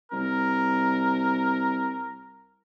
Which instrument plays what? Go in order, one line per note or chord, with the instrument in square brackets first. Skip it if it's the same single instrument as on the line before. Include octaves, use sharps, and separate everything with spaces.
[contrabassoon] C2 [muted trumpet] A#4